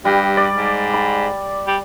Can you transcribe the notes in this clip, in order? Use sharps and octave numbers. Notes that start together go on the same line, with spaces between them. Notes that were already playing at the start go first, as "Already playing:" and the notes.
G2 G3
D5
G#2
B5
G3